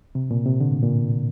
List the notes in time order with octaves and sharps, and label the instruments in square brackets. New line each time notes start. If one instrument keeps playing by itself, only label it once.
[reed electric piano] C3
A#2
C3
D3
A2
A#2